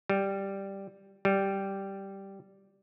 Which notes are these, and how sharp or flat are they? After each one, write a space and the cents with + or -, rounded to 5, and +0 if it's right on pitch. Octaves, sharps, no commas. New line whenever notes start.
G3 +0
G3 -5